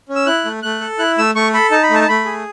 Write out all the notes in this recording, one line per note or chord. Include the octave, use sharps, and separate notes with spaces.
C#4
E6
E4 F#6
A3
A3 F#6
A4
E4 F#6
A3 E6
A3 C#6
A4 B5
D#4 A5
B5
A3 A5
A5
A3 B5
G#4